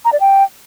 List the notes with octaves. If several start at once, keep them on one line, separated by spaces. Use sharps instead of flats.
A#5
D5
G5